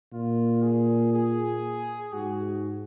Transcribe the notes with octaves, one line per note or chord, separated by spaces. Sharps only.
A#2 F4
G#4
G#4
G#2 F#4